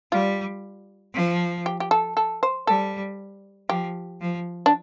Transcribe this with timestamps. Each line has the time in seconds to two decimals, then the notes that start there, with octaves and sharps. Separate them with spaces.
0.12 G3 F4
1.14 F3
1.66 G4
1.80 G4
1.91 A4
2.17 A4
2.43 C5
2.67 G3 A4
3.69 F3 G4
4.21 F3
4.66 D4